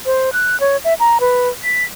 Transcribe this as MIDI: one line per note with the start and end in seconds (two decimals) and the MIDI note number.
0.06 0.33 72
0.33 0.59 90
0.60 0.77 73
0.84 0.94 76
1.00 1.18 82
1.20 1.49 71
1.64 1.84 95